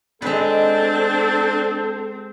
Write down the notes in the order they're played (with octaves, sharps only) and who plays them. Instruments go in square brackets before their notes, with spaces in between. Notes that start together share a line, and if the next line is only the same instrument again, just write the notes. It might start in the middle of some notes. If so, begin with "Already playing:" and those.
[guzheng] G#3 B4 [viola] C4 [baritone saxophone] D4 [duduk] A4